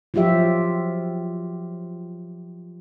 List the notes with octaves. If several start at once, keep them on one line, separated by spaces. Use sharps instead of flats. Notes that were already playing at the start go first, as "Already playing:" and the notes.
F3 F#3 F4 G4 E5